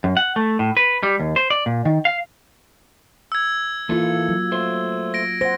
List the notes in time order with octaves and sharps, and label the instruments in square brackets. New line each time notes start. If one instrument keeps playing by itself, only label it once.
[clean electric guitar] F#2
F#5
A3
A2
B4
G3
D#2
C5
D5
A#2
D#3
F5
[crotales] E6 G#6
[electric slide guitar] E3 A4 [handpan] A#3 F4
[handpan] F#3
[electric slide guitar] A3 C5
[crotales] A#6 D7
[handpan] C5 F#5 [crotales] A#6